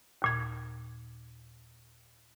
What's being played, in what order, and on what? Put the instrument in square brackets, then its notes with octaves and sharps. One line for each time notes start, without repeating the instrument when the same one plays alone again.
[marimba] D#2 A#2 G#6